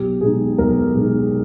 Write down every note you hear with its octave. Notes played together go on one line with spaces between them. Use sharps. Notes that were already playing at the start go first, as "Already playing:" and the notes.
Already playing: B1 G4
B2 G#3 D#4 G#4
B1 A#4
B2 G#3 D#4